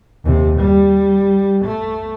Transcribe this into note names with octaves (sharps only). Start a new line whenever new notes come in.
D#2 C3
G3
A3